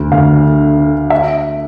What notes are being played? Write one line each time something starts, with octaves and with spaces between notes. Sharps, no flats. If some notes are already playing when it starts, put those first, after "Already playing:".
Already playing: D2
D2 F5
D3
D3
E5